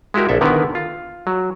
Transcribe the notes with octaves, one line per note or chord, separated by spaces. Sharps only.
G#3 E4 F#4 G4 A#4
A#1 A4 E5
D3 D#3 B3 E4 A#4 B4
F4
F#3